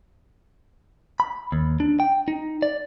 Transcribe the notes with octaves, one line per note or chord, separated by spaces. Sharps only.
B5
D#2
D4
G5
D#4
D5